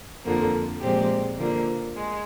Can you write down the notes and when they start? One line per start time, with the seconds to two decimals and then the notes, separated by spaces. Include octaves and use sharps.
0.25 F2 D3 F3 A#3
0.81 A#2 F3 G#3 C4 G4
1.38 D3 F3 A#3
1.96 G#3